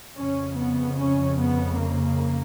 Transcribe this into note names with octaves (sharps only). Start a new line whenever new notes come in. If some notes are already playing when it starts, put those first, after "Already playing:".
F2 C#3 C#4
B3
C#4
B3
A#3